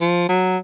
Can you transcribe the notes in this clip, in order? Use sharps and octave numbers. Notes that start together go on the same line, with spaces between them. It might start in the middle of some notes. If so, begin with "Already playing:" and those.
F3
F#3